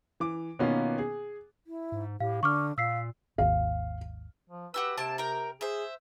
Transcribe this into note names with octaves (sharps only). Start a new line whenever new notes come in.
E3 D6
B2 D#3 A#3 B3 C#4 F4
G#4
E4
G#2
A2 G4 F5
D3 D4 C#6 D6 F6
A#2 F5 E6 B6 C7
G#1 D#2 F5
F3
F#4 G4 B4 E6
C3 A#3 C4 A5
A#4 G5
G#4 C5 E5